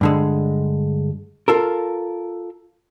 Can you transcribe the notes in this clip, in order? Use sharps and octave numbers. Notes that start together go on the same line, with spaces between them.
G2 D3 G#3
F4 A4 A#4